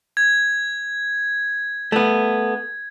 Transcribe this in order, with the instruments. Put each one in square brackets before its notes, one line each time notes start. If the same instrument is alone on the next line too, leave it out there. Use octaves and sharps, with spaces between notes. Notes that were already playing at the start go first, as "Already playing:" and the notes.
[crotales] G#6
[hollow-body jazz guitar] A3 B3